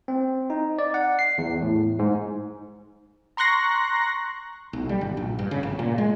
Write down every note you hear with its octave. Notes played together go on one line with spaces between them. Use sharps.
C4
D#4
D5
F#5
C7
E2
A2
G#2
A#5 C6 C#6 F#6 A#6
B1
G3
G1
A#1
G2
C#3
G1
A#2
G#3